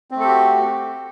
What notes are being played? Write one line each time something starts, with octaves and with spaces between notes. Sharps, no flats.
A3 C4 F#4 G4 A4